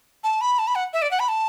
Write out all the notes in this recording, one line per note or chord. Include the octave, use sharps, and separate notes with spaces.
A5
B5
A5
B5
F#5
E5
D5
F#5
B5
A5